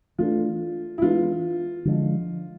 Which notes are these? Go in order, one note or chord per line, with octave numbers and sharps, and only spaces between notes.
E3 A3 D4 F4
E4
E3 G#3 B3 D4 F4
D3 F3 G#3